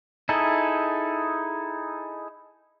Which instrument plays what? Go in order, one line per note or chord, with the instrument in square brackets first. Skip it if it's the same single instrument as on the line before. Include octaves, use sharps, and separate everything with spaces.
[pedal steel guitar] D#4 E4 G#4 A4